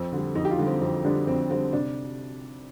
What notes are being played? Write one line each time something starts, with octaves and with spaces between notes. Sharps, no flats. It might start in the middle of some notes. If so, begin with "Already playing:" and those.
Already playing: F2 C4
D3 G3
F2 D#4
G4
F4
D3 G3
C4
F2 C4
D3 G3 D4
F2 C4
D3 G3 C4
C3 D4